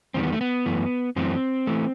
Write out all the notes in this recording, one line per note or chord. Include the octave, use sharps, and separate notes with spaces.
E2 D#3 G3 C4
B3
A3
B3
F#2 E3 A3
F#2 E3 A3 C4
E3 A3